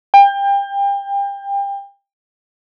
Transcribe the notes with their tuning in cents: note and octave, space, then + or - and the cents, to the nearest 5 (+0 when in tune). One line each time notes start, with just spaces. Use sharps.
G5 +30